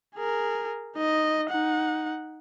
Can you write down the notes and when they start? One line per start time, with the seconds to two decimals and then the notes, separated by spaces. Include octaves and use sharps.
0.16 G#4 A#4
0.96 D#4 D#5
1.50 D#4 F#5